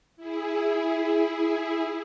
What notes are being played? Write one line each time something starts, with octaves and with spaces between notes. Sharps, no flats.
E4 G#4